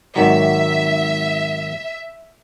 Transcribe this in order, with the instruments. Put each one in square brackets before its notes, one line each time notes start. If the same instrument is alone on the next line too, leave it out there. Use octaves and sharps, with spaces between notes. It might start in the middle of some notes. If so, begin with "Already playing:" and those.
[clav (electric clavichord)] G#1 D#3 F#3 [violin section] E5